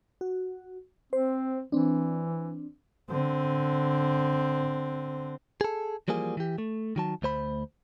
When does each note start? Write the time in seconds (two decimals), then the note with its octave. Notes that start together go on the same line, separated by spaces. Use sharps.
0.21 F#4
1.13 C4 C5
1.72 E3 C4 D4
3.10 D3 C4
5.61 G#4 A4
6.08 E3 F3 G3 A#3 G#4
6.37 E3 G4
6.58 A3
6.96 D#3 F#3 A5
7.22 D2 A3 C5 B5